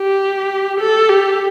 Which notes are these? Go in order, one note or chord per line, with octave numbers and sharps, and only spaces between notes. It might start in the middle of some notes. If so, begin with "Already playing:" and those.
Already playing: G4
A4
G4